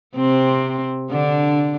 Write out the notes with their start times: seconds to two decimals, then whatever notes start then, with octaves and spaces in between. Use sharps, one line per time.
0.16 C3 C4
1.11 D3 D4